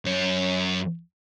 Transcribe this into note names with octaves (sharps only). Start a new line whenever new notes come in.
F#2 C#5